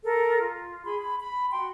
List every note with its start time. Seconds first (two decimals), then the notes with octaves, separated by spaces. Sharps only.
0.03 A4 A#4
0.39 F4
0.84 G#4 B5 C6
0.99 B5
1.20 B5
1.51 F#4 G5 C6